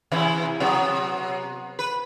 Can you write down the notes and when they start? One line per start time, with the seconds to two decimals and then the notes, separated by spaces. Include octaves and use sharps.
0.12 C3 E3 E4
0.60 C3 F#3 B3
1.79 B4